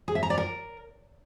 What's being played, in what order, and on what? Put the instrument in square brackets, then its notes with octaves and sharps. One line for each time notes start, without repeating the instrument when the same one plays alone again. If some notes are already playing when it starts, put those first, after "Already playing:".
[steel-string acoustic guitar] G#4
E5
A#5
D5
A#4